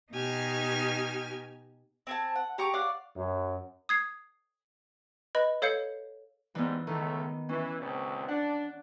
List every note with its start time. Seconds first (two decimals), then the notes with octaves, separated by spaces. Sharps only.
0.12 B2 D#4 G4 G#5 F6
2.07 C4 G#5 A5
2.35 F#5
2.58 G4 A#5 C#6 D6
2.73 C#5 D5 F5 F#5
3.16 F#2
3.89 D#6 G#6 C7
5.35 B4 D#5 B5
5.62 A4 C#5 F5 G6 C#7
6.55 G#2 E3 G3 B3
6.87 C#2 A2 D#3 A3
7.49 E3 C#4
7.80 C#2 A#2 C4
8.28 D4 F#5